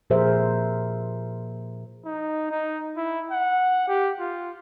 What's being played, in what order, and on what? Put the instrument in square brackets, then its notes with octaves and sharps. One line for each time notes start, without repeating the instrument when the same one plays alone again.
[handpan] A#2 F3 G#4 A#4 C5 E5
[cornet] D#4
D#4
E4
F#5
G4
F4